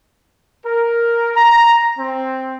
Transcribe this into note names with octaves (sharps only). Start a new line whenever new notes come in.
A#4
A#5
C4